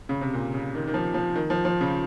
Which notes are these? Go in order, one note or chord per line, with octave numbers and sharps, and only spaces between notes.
C#3
C3
A#2
C#3
D#3
D#3
F3
F3
D#3
F3
F3
C#3